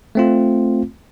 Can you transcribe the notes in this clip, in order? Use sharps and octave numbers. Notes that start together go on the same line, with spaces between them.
A3 C4 F4